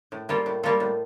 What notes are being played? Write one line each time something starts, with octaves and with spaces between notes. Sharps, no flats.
A2
G3 A#3 F4 A4
A2
G3 A#3 F4 A4
A2